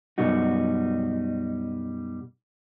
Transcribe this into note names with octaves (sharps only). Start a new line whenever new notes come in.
F#2 B2 G3 D#4 F#4